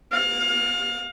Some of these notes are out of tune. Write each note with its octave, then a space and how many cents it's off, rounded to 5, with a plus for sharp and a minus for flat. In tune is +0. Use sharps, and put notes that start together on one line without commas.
F5 +30